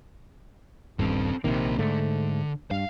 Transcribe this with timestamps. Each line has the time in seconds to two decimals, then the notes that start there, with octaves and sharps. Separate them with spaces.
0.99 D#1 G2 C4 A4
1.44 A#1 C3 D#3 A#3 C5
1.78 G#2 D3 A3
2.71 G2 F5